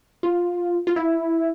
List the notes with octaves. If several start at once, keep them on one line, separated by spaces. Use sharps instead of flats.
F4
F4
E4